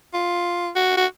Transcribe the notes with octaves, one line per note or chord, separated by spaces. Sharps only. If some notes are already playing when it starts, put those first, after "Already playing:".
F4
F#4
F#4